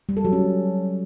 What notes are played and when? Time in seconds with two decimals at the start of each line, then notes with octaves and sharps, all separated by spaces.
0.09 G3
0.17 A4
0.25 F#3
0.33 C#4